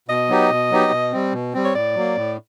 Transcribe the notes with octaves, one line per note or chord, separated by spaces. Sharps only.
B2 D#5
F#3 B3 D#4 G4
B2
F#3 B3 D#4 G4
B2
G3 C4
B2
G3 C4
C#5
A2 D5
F#3 A#3
A2